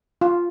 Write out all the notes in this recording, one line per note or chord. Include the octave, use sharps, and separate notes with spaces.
F4